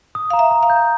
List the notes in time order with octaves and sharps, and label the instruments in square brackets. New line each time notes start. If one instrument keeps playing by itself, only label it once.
[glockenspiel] D#6
[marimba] F5 [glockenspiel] A#5
[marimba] E5
[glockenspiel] A#5
[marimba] F5
[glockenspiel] G6